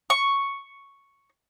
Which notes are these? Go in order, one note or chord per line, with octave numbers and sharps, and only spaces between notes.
C#6